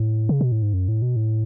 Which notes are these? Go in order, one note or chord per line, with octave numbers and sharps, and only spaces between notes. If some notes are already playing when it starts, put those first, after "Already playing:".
Already playing: A2
C#3
B2
A2
G#2
F#2
A2
B2
A2